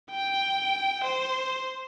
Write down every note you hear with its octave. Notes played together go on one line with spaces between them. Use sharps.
G5
C5